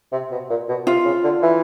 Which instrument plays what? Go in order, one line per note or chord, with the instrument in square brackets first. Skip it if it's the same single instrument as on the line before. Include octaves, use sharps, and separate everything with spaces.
[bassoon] C3
B2
A#2
B2
[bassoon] C3 [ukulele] F4
[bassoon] C#3
D3
E3